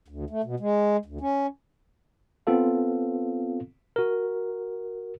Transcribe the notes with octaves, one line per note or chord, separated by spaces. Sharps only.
D2
A3
B2
G#3
D2
C#4
B3 C4 F4 A4 F5
F#4 A#4